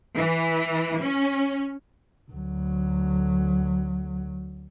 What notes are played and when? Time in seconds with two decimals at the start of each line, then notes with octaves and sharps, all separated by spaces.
0.15 E3
1.01 C#4
2.31 D2 F#3